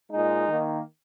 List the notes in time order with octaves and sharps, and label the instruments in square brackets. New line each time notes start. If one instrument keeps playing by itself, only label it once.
[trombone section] A#2 G#3 D#4
D#3 A#3